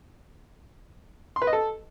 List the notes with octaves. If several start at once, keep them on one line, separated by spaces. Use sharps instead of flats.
C6
B4
D#5
A4